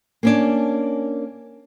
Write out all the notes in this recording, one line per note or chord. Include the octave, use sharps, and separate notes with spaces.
A#3 C#4 D4